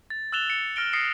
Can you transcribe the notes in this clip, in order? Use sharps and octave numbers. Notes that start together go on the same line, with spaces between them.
A6
E6 F#6 A6 E7 F7 G7
C#7
F6 A#6 D7 G7
D#6 A6 A#6 C7 C#7